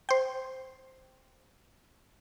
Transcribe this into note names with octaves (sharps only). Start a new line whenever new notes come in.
C5 G5